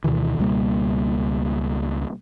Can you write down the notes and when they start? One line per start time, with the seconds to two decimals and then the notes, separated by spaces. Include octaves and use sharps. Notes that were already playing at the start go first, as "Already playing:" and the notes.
0.04 D2 B2 D#3 E3
0.39 C#2 B2 G3 A#3